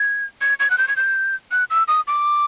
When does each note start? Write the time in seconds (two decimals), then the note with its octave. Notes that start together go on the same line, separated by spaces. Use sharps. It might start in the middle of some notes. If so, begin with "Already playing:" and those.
Already playing: G#6
0.41 G#6
0.60 G#6
0.70 F#6
0.78 G6
0.88 G#6
0.96 G6
1.51 F#6
1.70 E6
1.88 D#6
2.07 D6